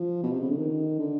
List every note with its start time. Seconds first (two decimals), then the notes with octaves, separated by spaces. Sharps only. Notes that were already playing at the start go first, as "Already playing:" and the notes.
Already playing: F3
0.23 B2
0.31 C3
0.40 C#3
0.49 D3
0.58 D#3
0.99 D3